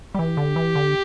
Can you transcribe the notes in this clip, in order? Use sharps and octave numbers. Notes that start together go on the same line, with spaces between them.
G3
E3 G4
D3
E3
D3